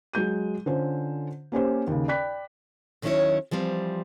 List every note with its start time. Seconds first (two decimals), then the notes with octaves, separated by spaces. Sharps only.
0.13 F#3 G#3 G6 D#7
0.66 D3 C#4 F4 C5
1.52 A#3 C#4 G4 C5
1.87 D#2 C#3
2.08 D5 G5 B5 F#6 B6
3.02 D#2 D#3 F#3 C#4 E4 C#5
3.51 E3 F3 G3 C4